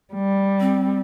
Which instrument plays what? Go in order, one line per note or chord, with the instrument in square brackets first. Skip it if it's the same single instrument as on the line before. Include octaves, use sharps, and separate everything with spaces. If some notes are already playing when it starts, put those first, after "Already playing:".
[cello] G3
[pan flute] C4